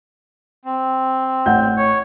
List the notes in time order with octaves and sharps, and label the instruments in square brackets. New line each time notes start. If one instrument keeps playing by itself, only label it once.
[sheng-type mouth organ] C4
[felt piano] A1 F#5 G6
[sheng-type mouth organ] C#5